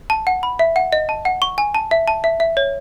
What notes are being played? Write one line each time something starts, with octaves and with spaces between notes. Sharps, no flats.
A5
F#5
B5
E5
F#5
D#5
A5
F#5
C#6
G#5
A5
E5
A5
E5
E5
C#5